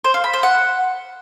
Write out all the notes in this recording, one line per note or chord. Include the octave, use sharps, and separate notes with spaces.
C5
F5
B5
C5
F#5